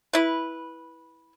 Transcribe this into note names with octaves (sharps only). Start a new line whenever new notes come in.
E4 B4